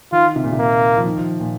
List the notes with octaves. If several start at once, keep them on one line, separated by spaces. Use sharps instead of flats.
D#3 F4
C3
A#2
C3
A#3
F3
D#3
F3
A#2